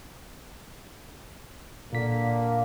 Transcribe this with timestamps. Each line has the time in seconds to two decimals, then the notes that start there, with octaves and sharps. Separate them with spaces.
1.93 A#2 D3 A#3 B6